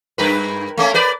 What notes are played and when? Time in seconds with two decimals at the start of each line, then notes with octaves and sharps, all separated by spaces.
0.18 G2 A#4 B4
0.78 A3 A#3 C#4
0.94 A#4 B4 D5